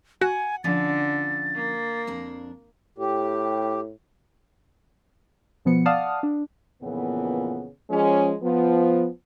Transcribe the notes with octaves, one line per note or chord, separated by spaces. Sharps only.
F#4 F#5 G#5
D3 F3 C#4 A6
A#3
F2 D4 A#4
A2 G4
B2 F3 B3 C#7
D5 F5 F#5 A5 D#6 F6
D4
F2 A#2 C#3 E3 B3
F3 G#3 C#4
F3 B3